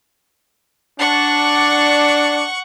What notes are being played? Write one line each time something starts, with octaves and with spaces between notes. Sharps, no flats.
D4 F#5 C#6